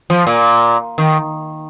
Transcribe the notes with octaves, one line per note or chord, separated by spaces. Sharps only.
F3
A#2
D#3